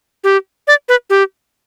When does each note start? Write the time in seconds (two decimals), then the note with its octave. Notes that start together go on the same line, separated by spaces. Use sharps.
0.24 G4
0.68 D5
0.89 B4
1.10 G4